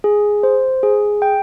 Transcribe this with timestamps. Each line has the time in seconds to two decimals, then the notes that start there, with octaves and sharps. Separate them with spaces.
0.04 G#4
0.43 C5
0.83 G#4
1.22 G5